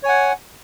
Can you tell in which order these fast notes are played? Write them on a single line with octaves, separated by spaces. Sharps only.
C#5 G#5 F#5